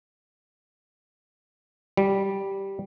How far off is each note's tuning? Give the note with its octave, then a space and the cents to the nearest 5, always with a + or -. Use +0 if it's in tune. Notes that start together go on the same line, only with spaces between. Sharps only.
G3 -5